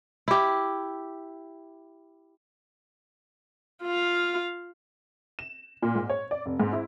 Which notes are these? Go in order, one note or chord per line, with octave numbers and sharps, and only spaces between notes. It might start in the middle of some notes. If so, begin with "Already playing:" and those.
E4 G4
F4 F5
E7
A#2
G#2
C#5
D5
F1
G#2
E4